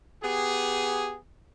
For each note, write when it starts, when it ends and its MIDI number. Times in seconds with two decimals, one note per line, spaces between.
0.23 1.18 59
0.23 1.18 67
0.23 1.18 68